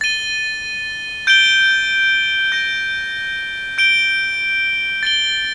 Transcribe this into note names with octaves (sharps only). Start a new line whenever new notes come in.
A6 D#7 G7
G6 D7 G7
G6 A#6 D7
G6 D7 G7
A6 D7 G7